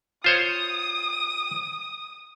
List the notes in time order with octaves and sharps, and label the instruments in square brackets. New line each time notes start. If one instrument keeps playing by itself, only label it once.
[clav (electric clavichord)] F4 C5 C#5 [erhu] D#6